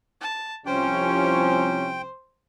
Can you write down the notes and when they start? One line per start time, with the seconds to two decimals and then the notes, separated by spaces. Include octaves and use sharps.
0.21 A5
0.66 C2 C3 F3 C#4 C5 G5